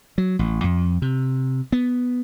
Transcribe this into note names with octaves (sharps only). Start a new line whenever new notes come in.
F#3
A1
F2
C3
B3